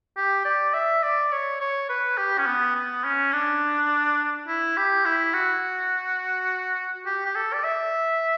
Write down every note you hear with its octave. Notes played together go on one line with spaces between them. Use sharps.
G4
D5
E5
D5
C#5
C#5
B4
G4
C#4
B3
B3
C#4
D4
E4
G4
E4
F#4
G4
G4
A4
D5
E5